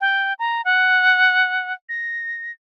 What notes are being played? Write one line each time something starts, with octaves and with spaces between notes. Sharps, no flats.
G5
A#5
F#5
A#6